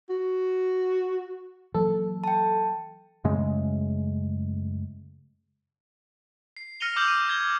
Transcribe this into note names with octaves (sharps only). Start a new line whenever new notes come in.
F#4
E3 F#3 A#3 A4
G5 A5
F#2 C#3 G#3 A3
C7
F6 A#6 C#7 D#7 F7 G7
D6 E6 F6 G6 F#7
D#7
G6 G#6 A#6 G7
G#6